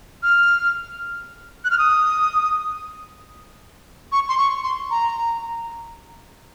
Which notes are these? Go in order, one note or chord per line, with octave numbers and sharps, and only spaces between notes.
F6
F#6
F6
D#6
C#6
C6
C#6
C6
A#5